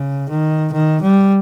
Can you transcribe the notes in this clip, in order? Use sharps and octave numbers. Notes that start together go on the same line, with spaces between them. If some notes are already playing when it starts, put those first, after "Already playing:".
Already playing: C#3
D#3
D#3
G3